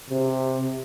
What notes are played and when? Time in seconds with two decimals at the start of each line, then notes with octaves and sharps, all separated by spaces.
0.10 C3